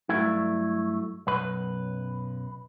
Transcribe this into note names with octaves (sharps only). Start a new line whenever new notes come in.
G2 F#3 A3 E4
B1 F#2 B4